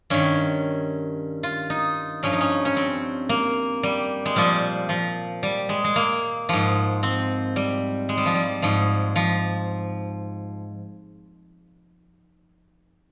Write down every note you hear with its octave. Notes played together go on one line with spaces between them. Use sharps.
G2 D#3 C#4
F4
D#4
G2 F3 C#4
D#4
C#4
C#4
C4
A#3
G3
G#3
A#2 F3 G3
F3
G3
G#3
G#3
A#3
G#2 F3
C4
G3
G#3
G3
F3
G3
G#2 F3
F3